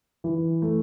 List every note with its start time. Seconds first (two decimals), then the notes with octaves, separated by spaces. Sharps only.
0.24 E3
0.62 A3